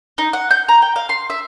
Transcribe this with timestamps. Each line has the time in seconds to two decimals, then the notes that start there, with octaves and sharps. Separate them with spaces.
0.18 D#4
0.33 F#5
0.51 G6
0.69 A#5
0.82 G5
0.96 F5
1.09 C6
1.30 E5